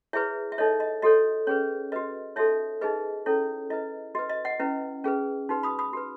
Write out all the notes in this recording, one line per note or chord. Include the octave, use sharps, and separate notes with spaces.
E4 G#4 B4 C#5 E5
E5
D#4 A4 C#5 D#5
D#5
F#4 A4 C#5 D#5
C#4 G#4 B4 C#5
F#4 B4 D#5
D#4 F#4 A4 C#5 E5
D#4 G#4 B4 D#5
C#4 E4 A4 C#5
E4 B4 D#5
F#4 B4 D#5
D#5
D#5 F#5
C#4 E4 B4
C#4 G#4 B4
D#4 F#4 B4
B5 D#6
B5 D#6
F#4 B4